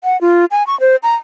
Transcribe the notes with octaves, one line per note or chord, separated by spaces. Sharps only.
F#5
F4
G#5
C#6
C5
A#5